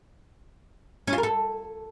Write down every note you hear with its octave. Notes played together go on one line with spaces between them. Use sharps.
C#4
F4
A#4
A4